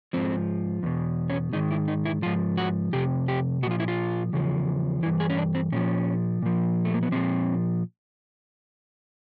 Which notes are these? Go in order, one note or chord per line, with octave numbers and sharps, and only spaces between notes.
G#2 F3 C4
E2 B2
C#4
G#2 D#3 D#4
E4
D#4
E4
G#2 F3 F4
F#4
F2 C3 G4
G4
A#2 F3 F4 F#4
E4
F4
E2 C#3 F3
G2 E3 E4
G#4
C#4
D4
C4
A#2 F3 C#4
A#2 F3
A3
A#3
B3
A#2 F3 C4